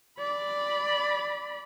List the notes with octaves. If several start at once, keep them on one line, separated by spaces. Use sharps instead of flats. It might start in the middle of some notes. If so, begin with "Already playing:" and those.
D5 B5